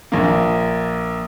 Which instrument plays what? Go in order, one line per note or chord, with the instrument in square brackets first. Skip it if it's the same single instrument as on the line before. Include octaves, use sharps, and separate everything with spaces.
[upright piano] A#1 A#3